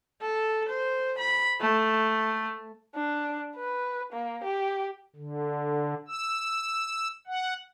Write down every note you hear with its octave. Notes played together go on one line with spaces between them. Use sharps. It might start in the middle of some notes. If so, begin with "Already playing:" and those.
A4
C5
B5
A3
D4
B4
A#3
G4
D3
E6
F#5